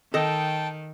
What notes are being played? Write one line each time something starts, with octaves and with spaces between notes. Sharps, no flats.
D#3 A4 D#5 G5 A5